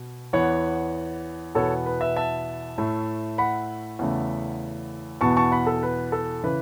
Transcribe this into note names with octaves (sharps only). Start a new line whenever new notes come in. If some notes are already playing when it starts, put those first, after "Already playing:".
Already playing: B2
E2 E3 B3 C#5 F#5
E2 B2 B3 A4 C#5
B4
B4 E5
E5 A5
A2 A3
F#5 B5
E2 C#3 A3
E2 B2 B3 A5 C#6
A5 C#6
F#5 B5
A4
B4
A4
C#3 E3 B4